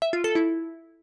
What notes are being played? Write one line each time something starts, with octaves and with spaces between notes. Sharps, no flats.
E5
F4
A4
E4